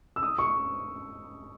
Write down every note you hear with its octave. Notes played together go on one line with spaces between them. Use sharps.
E6
D#6
C#6